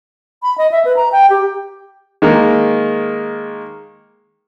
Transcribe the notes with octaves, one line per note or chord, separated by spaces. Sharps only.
B5
D#5
E5
B4
A#5
G5
G4
D#3 G#3 A#3